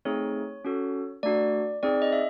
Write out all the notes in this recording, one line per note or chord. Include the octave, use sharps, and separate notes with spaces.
A3 C4 D#4 G#4 C#5
C#4 F#4 A4
A3 D4 F#4 D5
C4 D#4 G#4 D5
D#5
E5